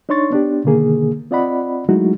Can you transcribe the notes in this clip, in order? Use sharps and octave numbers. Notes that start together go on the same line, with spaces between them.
D4 D#4 C#5 C6 C#6 A6
B3 D4 G4
B2 D3 D#3 A#3 G#4
C4 F4 D5 D#5 F#5 B5
F#3 G#3 A3 D#4 E4 F#4